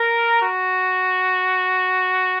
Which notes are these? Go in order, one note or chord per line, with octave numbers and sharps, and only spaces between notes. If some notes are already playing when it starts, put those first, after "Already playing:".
Already playing: A#4
F#4